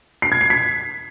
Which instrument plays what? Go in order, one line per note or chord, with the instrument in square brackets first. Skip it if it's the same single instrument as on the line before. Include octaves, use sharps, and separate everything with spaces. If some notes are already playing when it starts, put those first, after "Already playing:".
[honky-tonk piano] C7
G#6
C7
B6